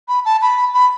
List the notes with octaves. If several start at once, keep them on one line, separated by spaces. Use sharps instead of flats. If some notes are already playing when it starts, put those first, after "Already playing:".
B5
A5
B5
B5